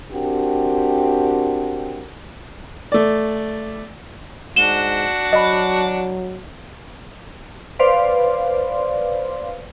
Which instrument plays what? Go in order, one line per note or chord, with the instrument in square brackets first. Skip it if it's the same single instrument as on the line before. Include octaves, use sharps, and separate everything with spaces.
[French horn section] C4 D4 F#4 G4 A#4
[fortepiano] A3 D5
[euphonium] G#2 [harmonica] D4 F#4 [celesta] E7 G7
[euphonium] F#3 [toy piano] D#5 B5
[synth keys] B4 C5 D5 F5 C6